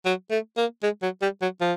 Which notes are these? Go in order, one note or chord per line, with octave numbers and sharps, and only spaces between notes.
F#3
A3
A#3
G#3
F#3
G3
F#3
F3